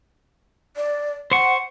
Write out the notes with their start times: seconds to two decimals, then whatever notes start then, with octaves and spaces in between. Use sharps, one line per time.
0.76 D5
1.31 C5 F#5 C#6